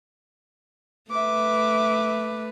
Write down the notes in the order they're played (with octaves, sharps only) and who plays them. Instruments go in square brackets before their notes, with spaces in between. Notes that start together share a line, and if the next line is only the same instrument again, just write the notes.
[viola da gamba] A3 B4 [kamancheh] E5 D6